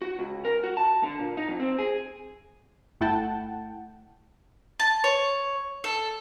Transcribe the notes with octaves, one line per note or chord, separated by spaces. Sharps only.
F#4
C#2
A#4
F#4
A5
D3
A#2
D#4
F2
C4
G#4
G1 A3 E4 F#5 G5 A5
A5
C#5
A4